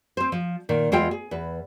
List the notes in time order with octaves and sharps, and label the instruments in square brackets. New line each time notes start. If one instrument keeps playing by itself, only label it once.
[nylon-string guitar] C4 C5
F3
A#2 D#3
E2 G#3 F4 A4 G5
G#4
E2 B4